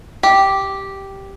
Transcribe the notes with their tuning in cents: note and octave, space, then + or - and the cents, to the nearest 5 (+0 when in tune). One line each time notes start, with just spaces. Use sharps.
G4 -5